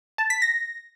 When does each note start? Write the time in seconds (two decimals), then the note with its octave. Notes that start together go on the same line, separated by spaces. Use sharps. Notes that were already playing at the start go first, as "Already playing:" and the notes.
0.18 A5
0.30 B6
0.42 A#6